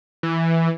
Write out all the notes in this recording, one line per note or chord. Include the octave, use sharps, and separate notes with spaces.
E3